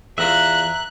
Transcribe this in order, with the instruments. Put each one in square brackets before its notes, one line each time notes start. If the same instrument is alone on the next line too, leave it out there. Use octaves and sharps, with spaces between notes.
[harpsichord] E2 F4 [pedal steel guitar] E5 A#5 [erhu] F#6